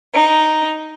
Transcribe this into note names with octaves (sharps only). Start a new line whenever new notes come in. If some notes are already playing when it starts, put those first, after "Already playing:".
D#4